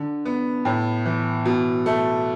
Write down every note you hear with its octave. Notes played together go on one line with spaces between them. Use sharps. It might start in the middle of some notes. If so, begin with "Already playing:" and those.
Already playing: D3
B3
A2
E3
B2
A3